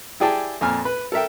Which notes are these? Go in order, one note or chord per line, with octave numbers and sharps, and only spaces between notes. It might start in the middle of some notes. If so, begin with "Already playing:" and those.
E4 G4 G#4 D5 G5 A5
F2 A#2 G#5 F6
B4
A4 A#4 E5 G5